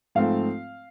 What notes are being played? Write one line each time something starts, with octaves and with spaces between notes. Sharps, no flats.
G#2 F3 A3 C4 F5